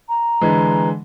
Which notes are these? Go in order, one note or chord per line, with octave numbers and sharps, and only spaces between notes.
A#5
D3 E3 G#3